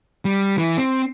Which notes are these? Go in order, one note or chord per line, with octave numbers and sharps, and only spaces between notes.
G3
E3
C4